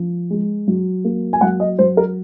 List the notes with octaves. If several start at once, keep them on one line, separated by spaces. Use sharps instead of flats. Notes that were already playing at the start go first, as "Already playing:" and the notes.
Already playing: F3
G#3
F#3
A#3
G#5
F#3 F#5
D#5
F#3 C5
A#4